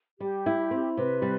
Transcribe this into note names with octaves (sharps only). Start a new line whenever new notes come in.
G3 G4
E4
C4
C3 B4
G3